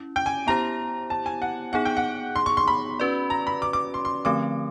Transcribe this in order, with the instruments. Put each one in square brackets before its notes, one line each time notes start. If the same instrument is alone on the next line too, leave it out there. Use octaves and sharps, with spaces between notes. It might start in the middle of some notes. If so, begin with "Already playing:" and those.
Already playing: [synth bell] C#4 E4
[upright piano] G5
G#5
[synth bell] B3 E4 G4 C5 [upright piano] A#5
[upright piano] A5
G#5
F#5
[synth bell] B3 D#4 G#4 [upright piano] F#5
[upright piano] G5
F#5
C6
C#6
C6
B5
[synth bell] C#4 F#4 B4 D5
[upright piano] A#5
B5
D6
D6
C6
C6
[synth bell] D3 F3 A3 C4 [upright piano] D6